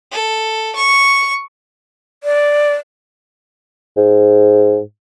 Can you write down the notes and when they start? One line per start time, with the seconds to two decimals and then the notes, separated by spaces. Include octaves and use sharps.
0.12 A4
0.75 C#6
2.23 D5
3.97 G#2